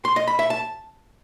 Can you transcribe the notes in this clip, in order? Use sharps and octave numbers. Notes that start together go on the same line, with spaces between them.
C6
D#5
B5
E5
A5